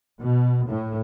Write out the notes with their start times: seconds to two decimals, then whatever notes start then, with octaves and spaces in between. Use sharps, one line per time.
0.20 B2
0.68 A2